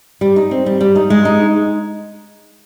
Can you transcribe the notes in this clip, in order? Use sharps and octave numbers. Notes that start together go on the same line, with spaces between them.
G3
D#4
C4
G3
G3
D#4
G#3
D#4